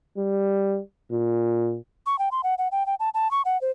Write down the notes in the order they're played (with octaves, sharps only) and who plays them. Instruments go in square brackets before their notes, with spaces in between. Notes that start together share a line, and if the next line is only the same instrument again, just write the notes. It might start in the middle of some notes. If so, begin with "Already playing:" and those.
[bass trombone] G3
A#2
[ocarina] C#6
G5
C6
F#5
F#5
G5
G5
A5
A5
C#6
F#5
C5